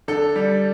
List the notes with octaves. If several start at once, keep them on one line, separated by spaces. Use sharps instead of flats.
D3 A4
G3